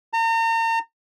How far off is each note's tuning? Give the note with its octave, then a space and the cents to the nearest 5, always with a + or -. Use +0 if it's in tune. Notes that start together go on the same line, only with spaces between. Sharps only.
A#5 -40